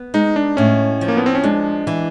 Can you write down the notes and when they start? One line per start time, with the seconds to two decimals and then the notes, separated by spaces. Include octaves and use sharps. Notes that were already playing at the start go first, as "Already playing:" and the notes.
Already playing: B3
0.14 G#3 D#4
0.36 D4
0.57 A2 C#4
1.01 F3
1.08 A#3
1.17 B3
1.26 C4
1.35 C#4
1.44 G#3 D4
1.87 E3